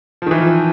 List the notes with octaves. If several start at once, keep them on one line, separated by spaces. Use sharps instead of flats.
D#3 F3
E3
F3